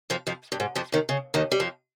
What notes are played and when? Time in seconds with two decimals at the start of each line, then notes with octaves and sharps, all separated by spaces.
0.10 F2 F3
0.27 F2 F3
0.52 G2
0.60 G#2
0.75 F2 F3
0.92 D#2 D#3
1.09 C#3
1.34 D#2 D#3
1.52 G3
1.60 F2 F3